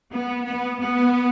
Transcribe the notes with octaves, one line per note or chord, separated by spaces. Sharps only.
B3
B3
B3